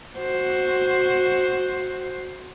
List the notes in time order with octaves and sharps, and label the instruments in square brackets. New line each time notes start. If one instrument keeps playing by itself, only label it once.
[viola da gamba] F#4 C5